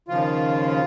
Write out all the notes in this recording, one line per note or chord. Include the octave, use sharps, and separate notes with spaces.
D#2 C#3 F3 F4